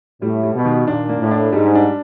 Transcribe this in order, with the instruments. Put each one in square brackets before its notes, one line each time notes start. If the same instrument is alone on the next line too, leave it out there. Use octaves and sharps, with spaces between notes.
[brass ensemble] A2 [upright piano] G3
[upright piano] G3
[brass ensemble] B2
[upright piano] D#3
[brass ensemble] A#2 [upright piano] D4
[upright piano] A#3
[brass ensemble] A2
[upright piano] D4
[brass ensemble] G#2 [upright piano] G3
[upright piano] D4